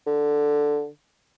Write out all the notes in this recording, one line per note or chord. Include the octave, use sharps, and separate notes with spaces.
D3